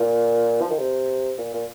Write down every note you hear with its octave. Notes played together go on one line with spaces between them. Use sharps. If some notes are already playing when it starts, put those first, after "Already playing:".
Already playing: A#2
F3
D#3
C3
A#2
A#2